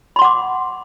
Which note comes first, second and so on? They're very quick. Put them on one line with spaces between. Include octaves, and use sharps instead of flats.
B5 C6 F#5 D6